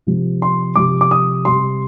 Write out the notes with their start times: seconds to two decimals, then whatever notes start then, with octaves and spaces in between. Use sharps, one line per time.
0.07 C3 F3
0.42 C6
0.76 C3 F3 D6
1.01 D6
1.11 D#6
1.45 C3 G3 C6